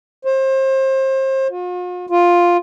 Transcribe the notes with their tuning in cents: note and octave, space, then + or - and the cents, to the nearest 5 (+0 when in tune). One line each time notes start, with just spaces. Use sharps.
C5 +30
F4 +45
F4 +5